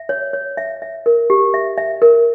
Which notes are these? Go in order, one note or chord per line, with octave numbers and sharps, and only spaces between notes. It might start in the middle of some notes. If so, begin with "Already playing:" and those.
Already playing: E5
C#5
C#5
E5
E5
A#4
G4
E5
E5
A#4